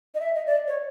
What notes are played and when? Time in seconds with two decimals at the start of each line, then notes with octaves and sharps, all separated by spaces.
0.15 D#5
0.20 E5
0.35 D#5
0.46 D5
0.68 C#5